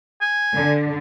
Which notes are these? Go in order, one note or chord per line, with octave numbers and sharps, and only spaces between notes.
G#5
D3